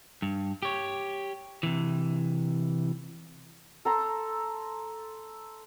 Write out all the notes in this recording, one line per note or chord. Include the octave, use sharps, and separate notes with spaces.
G2
G4 C#5
C3 E3
A4 A#5 C6